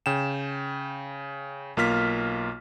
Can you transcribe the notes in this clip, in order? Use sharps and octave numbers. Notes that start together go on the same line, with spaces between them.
C#3 G5 E7
B1 A#3 F4 F6 B6